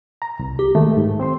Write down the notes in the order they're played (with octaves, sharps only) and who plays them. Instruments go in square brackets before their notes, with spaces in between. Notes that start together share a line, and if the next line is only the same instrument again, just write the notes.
[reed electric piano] A#5
C2
[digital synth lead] G4
[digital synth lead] D#3 [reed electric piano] G#3 A3
[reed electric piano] G#2
C4 C5 C6